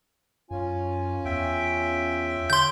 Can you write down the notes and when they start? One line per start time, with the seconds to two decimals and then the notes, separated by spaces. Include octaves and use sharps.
0.51 F#2 C#4 F4 G#5
1.25 E2 E5 G5
2.50 D3 C6 G6